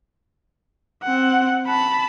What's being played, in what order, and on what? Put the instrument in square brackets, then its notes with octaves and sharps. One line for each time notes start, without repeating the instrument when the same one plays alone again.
[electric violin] C4 F#5
A5 B5